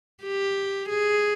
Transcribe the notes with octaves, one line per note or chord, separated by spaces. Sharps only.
G4
G#4